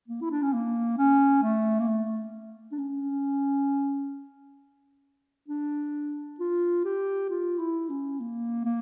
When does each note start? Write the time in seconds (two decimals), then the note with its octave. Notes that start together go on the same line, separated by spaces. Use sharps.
0.08 A#3
0.21 E4
0.31 D4
0.42 C#4
0.53 A#3
0.98 C#4
1.43 A3
1.79 A#3
1.88 A3
2.72 D4
2.78 C#4
5.48 D4
6.40 F4
6.85 G4
7.30 F4
7.59 E4
7.89 C#4
8.20 A#3
8.65 A#3